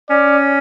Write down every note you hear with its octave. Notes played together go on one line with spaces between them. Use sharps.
C#4 D5